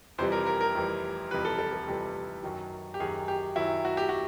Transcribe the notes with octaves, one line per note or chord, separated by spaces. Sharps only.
F2 C3 E3 G3 C5
A#4
A#4
A#4
F2 C3 E3 G3
F2 C3 E3 G3 B4
A4
A4
A4
F2 C3 E3 G3
F#2 D#3 F#3
G4
F#2 D#3 F#3 G#4
G4
F#2 D#3 F#3 E4
F#4
G4
F#4